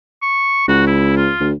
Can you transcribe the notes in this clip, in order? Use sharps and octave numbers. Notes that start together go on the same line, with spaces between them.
C#6
C#2 F#4
E4
F4
D2